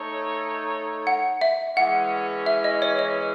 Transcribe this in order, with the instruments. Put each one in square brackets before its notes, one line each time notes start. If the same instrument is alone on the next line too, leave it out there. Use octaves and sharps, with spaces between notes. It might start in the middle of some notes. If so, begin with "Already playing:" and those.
Already playing: [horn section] A3 D#4 A4 C#5
[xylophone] F#5
E5
[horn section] E3 G#3 C#4 [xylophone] F#5
[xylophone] E5
D#5
C#5
D#5